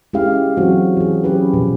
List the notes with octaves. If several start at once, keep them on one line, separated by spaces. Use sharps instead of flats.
G#3 C#4 E4 G4 G#4 F5
E3 F#3 G#3 C4 F#4 C5
E3 G#4
F#3 C#4 G4 G#4 B4
B2 F3